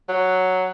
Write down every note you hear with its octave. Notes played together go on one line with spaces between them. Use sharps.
F#3